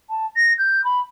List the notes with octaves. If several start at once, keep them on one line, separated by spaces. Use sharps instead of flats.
A5
A#6
G6
B5